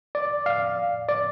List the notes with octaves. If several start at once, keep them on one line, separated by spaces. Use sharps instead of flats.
D5
F5
D5